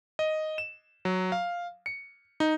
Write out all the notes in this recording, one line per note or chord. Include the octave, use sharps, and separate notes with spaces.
D#5
E7
F#3
F5
C#7
D#4